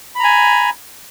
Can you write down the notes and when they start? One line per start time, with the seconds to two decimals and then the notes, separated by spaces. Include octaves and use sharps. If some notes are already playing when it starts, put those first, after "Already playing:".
0.15 B5
0.19 A#5
0.24 G#5